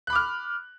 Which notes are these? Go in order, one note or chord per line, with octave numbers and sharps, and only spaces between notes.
B5 D6 F6 F#6